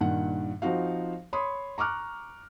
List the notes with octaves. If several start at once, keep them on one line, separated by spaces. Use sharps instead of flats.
G2 A#2 D#3 F#5
F3 C4 D#4 F#4 F5
C#5 B5 C6 D#6
A#5 C#6 D6 F6 F#6